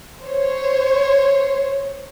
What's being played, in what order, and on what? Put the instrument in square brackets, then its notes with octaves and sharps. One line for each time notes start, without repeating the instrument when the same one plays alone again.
[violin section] C5 C#5